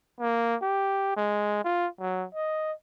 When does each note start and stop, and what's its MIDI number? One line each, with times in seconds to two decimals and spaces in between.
0.20 0.56 58
0.62 1.12 67
1.17 1.62 56
1.64 1.87 65
2.00 2.25 54
2.34 2.73 75